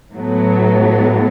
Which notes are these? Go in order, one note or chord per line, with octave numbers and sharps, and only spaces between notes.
A2 F#3 B3